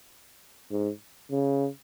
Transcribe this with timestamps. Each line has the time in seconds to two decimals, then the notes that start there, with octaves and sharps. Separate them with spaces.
0.71 G#2
1.31 C#3